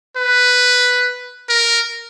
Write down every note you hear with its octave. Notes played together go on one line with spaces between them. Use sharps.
B4
A#4